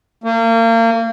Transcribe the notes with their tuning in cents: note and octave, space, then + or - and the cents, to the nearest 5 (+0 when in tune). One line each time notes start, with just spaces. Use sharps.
A#3 -35